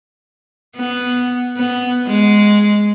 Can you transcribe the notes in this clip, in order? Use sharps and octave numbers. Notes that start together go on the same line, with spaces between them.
B3
B3
G#3